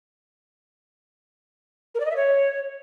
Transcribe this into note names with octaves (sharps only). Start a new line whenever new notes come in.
A#4
D5
D#5
E5
C#5